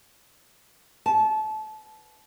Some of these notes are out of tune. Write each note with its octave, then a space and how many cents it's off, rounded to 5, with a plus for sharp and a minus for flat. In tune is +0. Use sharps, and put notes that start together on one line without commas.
B3 +0 A5 -25